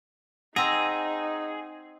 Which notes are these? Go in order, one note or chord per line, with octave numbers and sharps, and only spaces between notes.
C4 D#4 G#4 F#5 A#5 E6 A#6